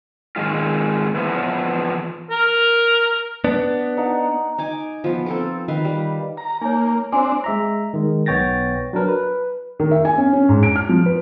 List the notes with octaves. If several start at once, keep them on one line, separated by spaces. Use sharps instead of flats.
D#3 G#3 F4
E3 F3 B3
A#4
B3 D4
D#4 F#5
D#4 G#5 D6
F3 B3
C4 A4 A#4
D#3 B4 F5
G3
A#5
A#3 D#4 C#5
C4 D4 F4 C5 G#5
G#3 E5 A#5
D#3 G#3
B1 B3 C#5 G5 A6 A#6
F#3 D4 A#4 B4
B4
D#3
E5
G#5
C#4
C#4
G#2
D7
F6
F3
B4